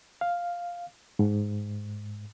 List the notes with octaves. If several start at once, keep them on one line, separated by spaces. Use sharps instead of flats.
F5
G#2